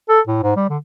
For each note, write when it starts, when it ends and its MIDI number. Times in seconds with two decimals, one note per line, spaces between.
0.09 0.20 69
0.27 0.40 45
0.43 0.54 44
0.56 0.68 55
0.69 0.77 50